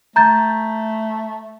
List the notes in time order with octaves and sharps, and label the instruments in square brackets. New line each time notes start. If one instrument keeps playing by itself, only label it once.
[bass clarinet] A3 [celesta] A#5 G6 A6